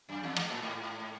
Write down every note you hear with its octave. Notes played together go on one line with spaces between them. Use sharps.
F#2
E2
G#2
A2
G#2